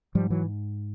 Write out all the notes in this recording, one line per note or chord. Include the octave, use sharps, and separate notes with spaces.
G#2 F3 G3
E3 F#3